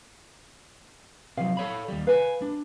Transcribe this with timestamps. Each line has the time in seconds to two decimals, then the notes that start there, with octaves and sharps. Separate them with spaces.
1.37 C3 F3 F#3 F5
1.57 A4 C#5 B5
1.88 D#2 G3
2.07 B4 F5 G#5
2.42 D4